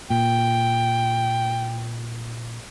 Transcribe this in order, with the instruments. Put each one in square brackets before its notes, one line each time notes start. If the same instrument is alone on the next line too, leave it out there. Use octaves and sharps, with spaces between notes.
[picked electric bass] A#2 [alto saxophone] G5